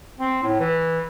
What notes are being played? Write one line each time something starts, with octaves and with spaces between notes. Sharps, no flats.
C4
A2
E3